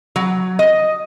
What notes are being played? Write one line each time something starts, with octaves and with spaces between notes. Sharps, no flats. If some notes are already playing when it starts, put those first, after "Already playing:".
F#3
D#5